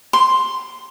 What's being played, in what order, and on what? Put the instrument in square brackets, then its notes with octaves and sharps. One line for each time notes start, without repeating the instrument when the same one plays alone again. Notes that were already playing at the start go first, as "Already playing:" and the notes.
[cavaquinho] C6